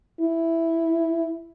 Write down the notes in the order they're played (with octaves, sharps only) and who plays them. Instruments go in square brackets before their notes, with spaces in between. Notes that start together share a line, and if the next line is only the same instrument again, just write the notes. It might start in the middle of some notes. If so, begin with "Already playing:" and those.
[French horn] E4